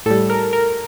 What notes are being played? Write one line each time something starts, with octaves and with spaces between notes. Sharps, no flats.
A2 G3 A4
A#4
A#4